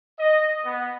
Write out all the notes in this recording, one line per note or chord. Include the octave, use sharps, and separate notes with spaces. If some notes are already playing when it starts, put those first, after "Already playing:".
D#5
B3